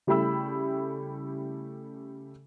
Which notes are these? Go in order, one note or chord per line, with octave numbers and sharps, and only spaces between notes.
C#3 G3 A3 E4 B5 E6